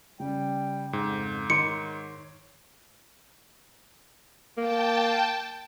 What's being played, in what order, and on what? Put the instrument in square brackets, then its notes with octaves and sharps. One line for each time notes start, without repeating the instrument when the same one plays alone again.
[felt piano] C#3 [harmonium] G3 G5
[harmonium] F2 [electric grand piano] G#2
[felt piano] D#3 C6 D7 [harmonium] C#5 [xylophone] C#7
[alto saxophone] A#3 [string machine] G5 A5